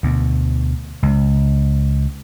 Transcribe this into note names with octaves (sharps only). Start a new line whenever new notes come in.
D2 B2
C#2